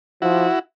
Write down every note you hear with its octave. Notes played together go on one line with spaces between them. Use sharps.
F3 E4 F#4